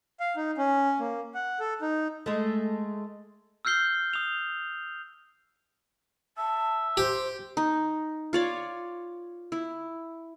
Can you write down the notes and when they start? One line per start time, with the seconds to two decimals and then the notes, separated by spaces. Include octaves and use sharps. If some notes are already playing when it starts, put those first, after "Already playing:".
0.20 F5
0.36 D#4
0.57 C#4
0.99 A#3
1.34 F#5
1.60 A4
1.82 D#4
2.26 G#3 A3
3.65 E6 F6 G6 C7 G7
4.13 D#6 F7
6.38 E5 A5
6.97 G4 C5
7.57 D#4
8.33 F4 C#5 D5
9.52 E4